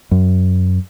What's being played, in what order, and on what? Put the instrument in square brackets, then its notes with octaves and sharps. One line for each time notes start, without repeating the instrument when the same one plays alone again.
[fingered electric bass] F#2